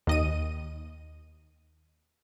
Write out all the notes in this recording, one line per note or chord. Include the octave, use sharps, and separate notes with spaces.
D#2 D#5 D#7